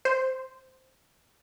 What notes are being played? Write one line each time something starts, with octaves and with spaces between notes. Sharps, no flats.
C5